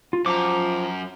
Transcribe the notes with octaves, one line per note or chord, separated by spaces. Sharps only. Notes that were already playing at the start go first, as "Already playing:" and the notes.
F4
F#2 F3 A#5 D6